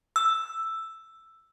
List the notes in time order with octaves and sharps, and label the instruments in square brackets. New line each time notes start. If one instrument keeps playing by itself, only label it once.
[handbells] E6